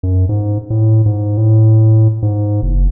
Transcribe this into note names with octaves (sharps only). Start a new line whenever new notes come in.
F#2
G#2
A2
G#2
A2
G#2
F#1